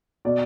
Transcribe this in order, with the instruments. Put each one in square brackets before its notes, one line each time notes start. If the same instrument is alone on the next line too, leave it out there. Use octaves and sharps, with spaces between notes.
[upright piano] B2 D5